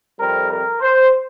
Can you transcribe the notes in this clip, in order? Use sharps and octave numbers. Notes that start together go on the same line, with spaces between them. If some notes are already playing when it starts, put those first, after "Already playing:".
F2 C3 G3 C4 A#4
A#4
C5